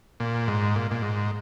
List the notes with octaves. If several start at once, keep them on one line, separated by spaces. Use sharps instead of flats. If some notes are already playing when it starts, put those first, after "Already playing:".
A#2
G#2
A#2
A#2
G#2